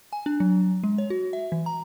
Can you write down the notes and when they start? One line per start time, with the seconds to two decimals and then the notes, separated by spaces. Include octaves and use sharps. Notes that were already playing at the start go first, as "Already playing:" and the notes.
0.13 G#5
0.26 D4
0.40 F#3
0.84 G#3
0.98 C#5
1.10 F#4
1.33 E5
1.52 E3
1.66 A#5